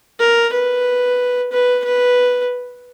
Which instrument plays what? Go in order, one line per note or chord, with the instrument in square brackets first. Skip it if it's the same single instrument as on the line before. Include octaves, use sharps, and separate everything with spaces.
[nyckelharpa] A#4
B4
B4
B4